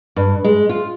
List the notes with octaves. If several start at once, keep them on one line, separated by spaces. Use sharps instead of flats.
G2
G#3
F4